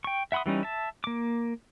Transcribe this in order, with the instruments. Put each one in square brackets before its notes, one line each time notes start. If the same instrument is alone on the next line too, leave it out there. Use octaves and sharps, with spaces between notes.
[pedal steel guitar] G5 C#6
E5 F#5 B5 C6 D#6
E3 G3 C#4 D#4
E5 A5
A#3 D6